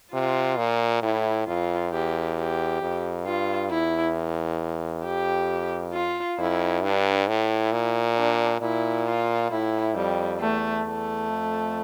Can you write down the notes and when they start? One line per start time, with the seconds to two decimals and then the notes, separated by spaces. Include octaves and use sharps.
0.13 C3 F4
0.58 A#2
1.02 A2 E4
1.47 F2 F4
1.92 E2 G4
2.36 G4
2.81 F2
3.25 G2 F4
3.70 E2 E4
5.04 F2 G4
5.93 F4
6.38 F2 E4
6.83 G2 D4
7.27 A2 E4
7.72 A#2
8.17 D4
8.61 A#2 E4
9.07 F4
9.50 A2 E4
9.95 F2 G3
10.40 E2 A3
10.85 E2 A3
11.29 F2